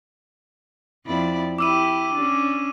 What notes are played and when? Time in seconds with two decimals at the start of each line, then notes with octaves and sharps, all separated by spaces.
1.06 F2 E4 D5
1.59 E4 G4 D6 E6 D#7
2.14 C#4 D4